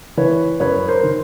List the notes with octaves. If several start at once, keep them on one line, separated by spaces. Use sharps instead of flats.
E3 B4 C#5
F#2 B4 C#5
A#4 C5
D#3